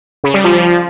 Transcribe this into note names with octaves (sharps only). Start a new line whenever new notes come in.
C#3
G3
F3